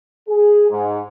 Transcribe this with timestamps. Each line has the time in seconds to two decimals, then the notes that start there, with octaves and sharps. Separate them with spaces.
0.28 G#4
0.70 G#2